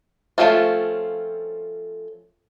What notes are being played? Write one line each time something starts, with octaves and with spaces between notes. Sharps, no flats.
F3 A3 C4 C#4 F4